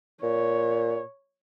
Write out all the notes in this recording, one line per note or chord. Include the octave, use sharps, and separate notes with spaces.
A#2 C#5